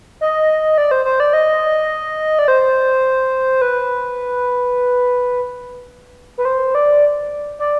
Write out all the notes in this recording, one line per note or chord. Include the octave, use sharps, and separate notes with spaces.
D#5
D5
C5
C5
D5
D#5
D5
C5
B4
B4
C5
D5
D5